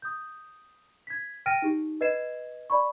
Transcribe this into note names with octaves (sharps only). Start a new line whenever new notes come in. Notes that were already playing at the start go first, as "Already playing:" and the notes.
D#6 G6
G#6 B6
G5 F6 A6 A#6 D7 D#7
D#4 G4
B4 D#5 G#6 C7 E7
D5 B5 C#6